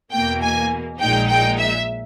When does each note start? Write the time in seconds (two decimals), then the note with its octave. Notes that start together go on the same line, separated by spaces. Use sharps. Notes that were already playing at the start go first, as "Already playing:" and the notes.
0.12 E2 B2 A#3 G5
0.42 G#5
0.99 A#1 A#2 G#3 D#4 G5
1.28 G5
1.58 E5